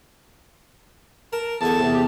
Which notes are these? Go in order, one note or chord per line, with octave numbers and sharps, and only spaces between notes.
A#4 A5
E2 D3 G#5 A5
E2 C3
G4